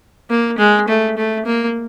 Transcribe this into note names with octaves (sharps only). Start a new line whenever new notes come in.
A#3
G#3
A3
A3
A#3